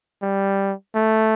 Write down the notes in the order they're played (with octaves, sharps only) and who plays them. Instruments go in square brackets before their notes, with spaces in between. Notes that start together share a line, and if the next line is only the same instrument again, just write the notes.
[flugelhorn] G3
A3